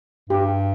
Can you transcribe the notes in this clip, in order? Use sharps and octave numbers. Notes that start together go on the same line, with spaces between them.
G2 G4